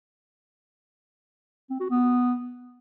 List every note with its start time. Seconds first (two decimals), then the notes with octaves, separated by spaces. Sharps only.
1.70 C4
1.80 F#4
1.90 B3